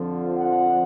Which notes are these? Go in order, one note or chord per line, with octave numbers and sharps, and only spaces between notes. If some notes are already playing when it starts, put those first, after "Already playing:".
Already playing: F2 D3 F3
F#5